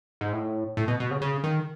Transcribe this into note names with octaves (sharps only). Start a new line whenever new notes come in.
G#2
A2
A2
B2
B2
C#3
C#3
D#3